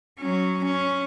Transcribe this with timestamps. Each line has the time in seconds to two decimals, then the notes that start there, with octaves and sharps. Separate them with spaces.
0.19 F#3 C#4
0.65 C#4